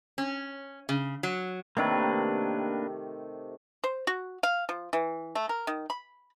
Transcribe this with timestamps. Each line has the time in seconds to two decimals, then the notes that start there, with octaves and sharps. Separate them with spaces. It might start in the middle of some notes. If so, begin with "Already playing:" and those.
0.18 C#4
0.89 C#3
1.23 F#3
1.77 C3 D#3 A3 A#3 D4 B4
3.84 C5
4.07 F#4
4.43 F5
4.69 F3
4.93 E3
5.35 A3
5.49 A#4
5.67 D#3
5.90 B5